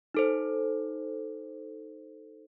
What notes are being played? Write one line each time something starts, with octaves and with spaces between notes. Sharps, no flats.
D#4 A4 C5